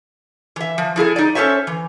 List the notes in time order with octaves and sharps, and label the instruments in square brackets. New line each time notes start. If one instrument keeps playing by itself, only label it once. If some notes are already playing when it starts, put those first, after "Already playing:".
[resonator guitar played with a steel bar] E3 E5
F3
F3 E4 G#4 A4
D#4 D5
C#4 A4 C5 C#5 E5
E3